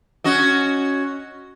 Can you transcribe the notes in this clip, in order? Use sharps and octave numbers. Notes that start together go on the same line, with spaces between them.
C#4 F#4 D#5